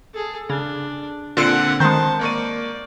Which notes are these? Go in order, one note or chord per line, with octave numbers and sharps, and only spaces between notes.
G#4 A4
C#3 D4
A#2 D3 C4 F4 A4 F#5 D7
D#3 G#3 C5 A5 G6
A#3 D5 C#6 D#7